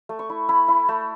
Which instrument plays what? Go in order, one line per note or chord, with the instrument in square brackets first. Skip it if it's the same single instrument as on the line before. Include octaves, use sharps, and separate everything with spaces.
[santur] A3
C#6
E4
E4 B5
E4
A3